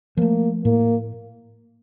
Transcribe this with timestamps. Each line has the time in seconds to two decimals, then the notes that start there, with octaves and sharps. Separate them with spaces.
0.17 F3 A3 A#3
0.64 A2 A#3